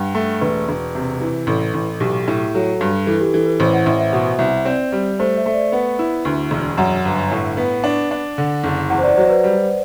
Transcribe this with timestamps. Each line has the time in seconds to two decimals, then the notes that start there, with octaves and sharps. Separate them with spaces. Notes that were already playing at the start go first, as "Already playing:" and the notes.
Already playing: G2 F#5 G5
0.15 A3
0.41 E1 B4
0.69 E1
0.95 C3
1.21 E3
1.47 A1 A4
1.74 A1
2.00 B1 G4
2.28 A2
2.54 F#3 A4
2.81 G2
3.07 E3 A4
3.21 G4
3.33 E3 A4
3.46 B4
3.60 A1 C5
3.73 F#5
3.86 A1 E5
4.00 E5
4.13 B2 F#5
4.39 C2 E5
4.65 C4 D5
4.92 G3
5.19 A3 C5
5.37 E5
5.46 A3
5.54 D5
5.72 B3 F#5
5.99 E4
6.25 D2
6.51 E1
6.78 F#2 F#5
7.05 G1
7.32 A2
7.57 B3
7.84 D4
8.11 D4
8.38 D3
8.64 F#1
8.90 E2 F#5
8.98 C5
9.03 D5
9.17 F#3 C5
9.30 B4
9.44 G3